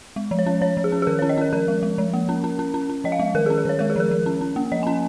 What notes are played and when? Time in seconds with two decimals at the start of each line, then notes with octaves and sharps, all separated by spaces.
0.16 G#3
0.31 F3
0.39 C#5
0.46 C#4
0.61 F3 C#5
0.77 F3
0.84 G#4
0.92 C#4
1.02 G#4
1.07 D#3 A#4
1.19 C#4 C#5
1.29 D#5
1.37 C#4 A#4
1.53 F3 A#4
1.68 G#3
1.83 G#3
1.98 F3
2.13 A#3
2.29 C#4
2.44 C#4
2.59 C#4
2.74 C#4
2.90 C#4
3.04 F3 D#5
3.12 F5
3.19 G#3
3.35 D#3 A#4
3.46 C#4 G#4
3.58 A#4
3.65 D#3 C#5
3.79 G#3 A#4
3.90 G#4
3.96 F3 A#4
4.11 F3
4.26 C#4
4.41 C#4
4.56 A#3
4.72 F3 D#5
4.83 C#4 G#5